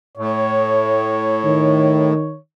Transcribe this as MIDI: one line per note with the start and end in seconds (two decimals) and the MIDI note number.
0.17 2.13 45
0.17 2.39 73
1.45 2.37 51